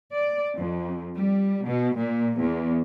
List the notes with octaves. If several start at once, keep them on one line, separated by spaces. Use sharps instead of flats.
D5
F2
G3
B2
A#2
E2